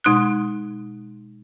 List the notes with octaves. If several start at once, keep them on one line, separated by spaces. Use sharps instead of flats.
B2 G#3 D#4 D#6 F#6